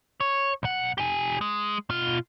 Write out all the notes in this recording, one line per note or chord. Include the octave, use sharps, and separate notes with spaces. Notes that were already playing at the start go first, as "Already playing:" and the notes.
C#5
B1 F#5
G4 G#5
G#3
B2 F4